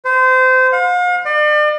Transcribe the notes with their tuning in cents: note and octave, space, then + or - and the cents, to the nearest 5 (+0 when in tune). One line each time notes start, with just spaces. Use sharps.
C5 -25
F5 +45
D5 +40